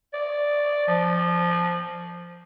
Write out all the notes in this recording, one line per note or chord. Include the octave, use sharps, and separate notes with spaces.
D5
F3